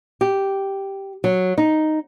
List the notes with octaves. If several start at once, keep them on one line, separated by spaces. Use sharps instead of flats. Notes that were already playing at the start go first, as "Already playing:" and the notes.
G4
F#3
D#4